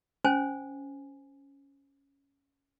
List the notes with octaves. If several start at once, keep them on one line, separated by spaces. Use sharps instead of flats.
C#4 C5 G#5